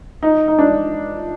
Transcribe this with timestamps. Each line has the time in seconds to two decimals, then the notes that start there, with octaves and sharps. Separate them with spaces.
0.23 D#4
0.48 D#4
0.59 D4